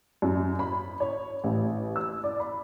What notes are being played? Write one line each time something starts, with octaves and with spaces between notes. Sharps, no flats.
F#2
B5
C#5
A1
E6
D5
B5